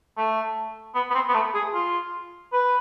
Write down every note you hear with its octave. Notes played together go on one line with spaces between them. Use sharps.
A3
B3
B3
C4
B3
A3
G#4
F4
B4